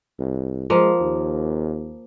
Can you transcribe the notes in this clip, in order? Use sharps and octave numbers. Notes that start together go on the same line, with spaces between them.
C2
F3 G#3 A#3
D#2